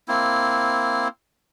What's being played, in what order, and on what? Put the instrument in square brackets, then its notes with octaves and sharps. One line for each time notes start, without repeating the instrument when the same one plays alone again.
[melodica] A#3 C4 E4